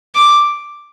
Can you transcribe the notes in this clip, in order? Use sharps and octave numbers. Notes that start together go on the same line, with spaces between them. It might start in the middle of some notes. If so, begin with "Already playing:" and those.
D6